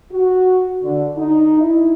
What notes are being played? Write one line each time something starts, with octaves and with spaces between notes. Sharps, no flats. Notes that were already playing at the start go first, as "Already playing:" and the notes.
F#4
D3
D#4
E4